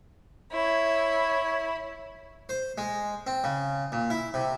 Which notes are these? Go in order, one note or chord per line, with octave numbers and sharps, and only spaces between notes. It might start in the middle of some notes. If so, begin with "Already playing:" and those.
E4 C#5
C5
G#3
C4
C#3
A#2
E4
C3